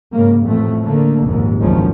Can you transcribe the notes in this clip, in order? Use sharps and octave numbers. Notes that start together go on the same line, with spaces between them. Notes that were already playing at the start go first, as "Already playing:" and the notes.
G#2 C#3 A#3
A1 F2 A2 A3
D3 A3 A#3
F1 A#1 D#2 G#2
F#1 D2 G#2 D#3 F3 C#4